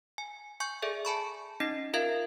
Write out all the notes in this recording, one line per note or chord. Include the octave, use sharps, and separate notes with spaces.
G#5
G#5 C#6 G6
G#4 A4 D5 E5
G#5 A5 B5 C#6
C#4 D#4 D#5 C7
F4 A#4 E5 F5 G#6